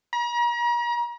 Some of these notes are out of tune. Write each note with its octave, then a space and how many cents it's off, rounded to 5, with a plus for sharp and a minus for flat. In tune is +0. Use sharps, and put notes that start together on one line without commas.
A#5 +40